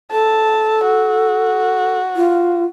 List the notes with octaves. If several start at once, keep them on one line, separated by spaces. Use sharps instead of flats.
A4 A5
F#4
F4